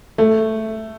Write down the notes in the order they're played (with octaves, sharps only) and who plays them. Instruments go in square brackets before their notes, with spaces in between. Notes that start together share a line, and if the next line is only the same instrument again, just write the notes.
[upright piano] A3